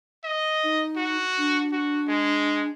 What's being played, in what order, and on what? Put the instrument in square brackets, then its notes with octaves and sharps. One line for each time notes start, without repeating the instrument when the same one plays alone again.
[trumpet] D#5
[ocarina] D#4
[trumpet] F#4
[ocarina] D4
[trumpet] F#4
G#3